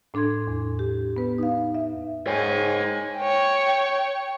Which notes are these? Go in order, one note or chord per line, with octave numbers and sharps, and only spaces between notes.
A2 D4 A4 C6 G#6
E2
G4
B3 B4
D#4 F5
E5
G#2 C#5 G5 G#5
C#5 G5